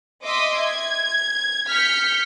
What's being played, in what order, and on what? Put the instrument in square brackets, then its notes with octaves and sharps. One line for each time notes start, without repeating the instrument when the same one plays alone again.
[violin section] D#5 E5 C6 D6 D#6
G#6
F6 G6 B6 C#7